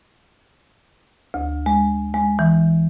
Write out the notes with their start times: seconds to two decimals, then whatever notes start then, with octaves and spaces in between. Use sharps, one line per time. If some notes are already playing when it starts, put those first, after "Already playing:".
1.34 D2
1.66 G#3
2.14 G#3
2.39 E3